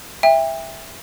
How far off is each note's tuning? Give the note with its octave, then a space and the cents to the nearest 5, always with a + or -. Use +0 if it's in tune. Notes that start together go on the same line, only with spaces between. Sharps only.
E5 +0 G5 +35